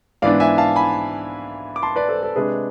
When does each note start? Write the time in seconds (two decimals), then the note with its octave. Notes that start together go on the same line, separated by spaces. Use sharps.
0.22 G#2 E3 B3 D4 D5 F5
0.40 E5 G#5
0.58 F5 A5
0.76 G#5 B5
1.76 D6
1.83 A5 C6
1.96 B4 D5
2.09 A4 C5
2.23 A4
2.36 C3 G#3 D4 G#4 B4